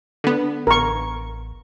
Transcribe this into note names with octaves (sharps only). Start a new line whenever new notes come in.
D3 B3
A1 A#4 C#6